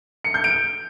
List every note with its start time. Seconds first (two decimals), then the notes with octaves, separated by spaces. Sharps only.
0.24 C#7
0.34 G6
0.44 D7